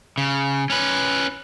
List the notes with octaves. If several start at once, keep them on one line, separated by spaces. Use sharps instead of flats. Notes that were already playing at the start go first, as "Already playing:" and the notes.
C#3
C#4 B4